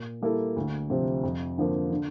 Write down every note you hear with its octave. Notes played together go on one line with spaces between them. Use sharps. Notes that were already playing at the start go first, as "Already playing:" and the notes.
Already playing: A#2
G3 A#3 E4 A4
D2
C3 F3 C4
F2
D3 F3 A#3
D3